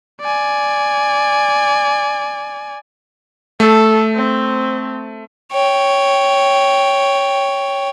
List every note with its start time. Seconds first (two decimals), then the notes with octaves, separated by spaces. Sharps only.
0.21 D5 G#5
3.60 A3 A4
4.15 C4
5.53 C#5 G5